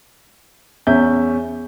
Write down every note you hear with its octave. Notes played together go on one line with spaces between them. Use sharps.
E2 C#4 E5 G6